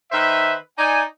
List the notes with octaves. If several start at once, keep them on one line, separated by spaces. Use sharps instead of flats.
D#3 B4 C5 E5
D#4 D5 G#5